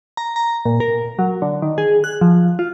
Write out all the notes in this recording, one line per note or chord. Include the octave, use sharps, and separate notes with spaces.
A#5
A#5
A#2
A#4
F#3
D3
D#3
G#4
F#6
F3
F4